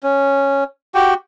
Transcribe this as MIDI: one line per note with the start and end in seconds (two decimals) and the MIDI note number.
0.03 0.64 61
0.95 1.14 66
0.95 1.14 67
0.95 1.14 79